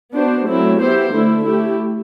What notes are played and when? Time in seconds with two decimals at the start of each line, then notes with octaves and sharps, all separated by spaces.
0.15 B3 D4 F#4 C5
0.48 F#3 A3 C4 E4
0.81 B3 E4 G4 C5
1.13 D3 A3 E4
1.46 A3 E4 G4